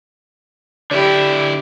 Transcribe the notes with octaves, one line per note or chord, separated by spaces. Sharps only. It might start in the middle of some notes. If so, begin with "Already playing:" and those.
D3 E4 G4 D5 B5